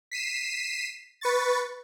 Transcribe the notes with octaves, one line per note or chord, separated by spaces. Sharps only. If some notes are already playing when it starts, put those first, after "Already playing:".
B6 C7 D#7 E7
B4 C#6 A6